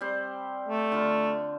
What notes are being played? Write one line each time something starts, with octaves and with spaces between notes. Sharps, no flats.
G3 C4 C5
A3
D3 F4